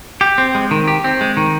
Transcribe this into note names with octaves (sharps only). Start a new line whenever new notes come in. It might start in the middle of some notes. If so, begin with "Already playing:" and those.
G4
C4
G#3
D#3
G4
C4
G#3
D#3